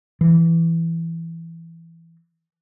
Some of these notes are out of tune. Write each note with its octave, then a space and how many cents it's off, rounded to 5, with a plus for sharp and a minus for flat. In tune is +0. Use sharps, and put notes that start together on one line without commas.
E3 +10